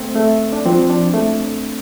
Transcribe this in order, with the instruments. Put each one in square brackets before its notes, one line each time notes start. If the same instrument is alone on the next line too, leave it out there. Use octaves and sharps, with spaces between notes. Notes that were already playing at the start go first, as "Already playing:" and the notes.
Already playing: [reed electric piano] A3 C4
A3
D4
[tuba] F3 [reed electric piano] C4
[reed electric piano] D4
A3